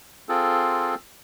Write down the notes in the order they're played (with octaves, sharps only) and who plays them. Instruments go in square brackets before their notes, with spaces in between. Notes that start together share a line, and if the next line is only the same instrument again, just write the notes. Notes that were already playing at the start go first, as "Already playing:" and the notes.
[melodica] C4 F4 G#4 A4